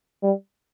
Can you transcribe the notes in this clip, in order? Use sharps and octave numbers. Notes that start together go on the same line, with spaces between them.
G3